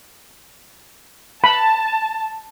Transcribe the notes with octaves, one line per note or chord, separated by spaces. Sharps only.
A5 B5